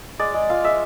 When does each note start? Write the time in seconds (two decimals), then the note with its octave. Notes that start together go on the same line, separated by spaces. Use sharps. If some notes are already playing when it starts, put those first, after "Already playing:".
0.19 G#3 D5
0.34 G#3
0.49 F4 F5
0.64 G#3 E5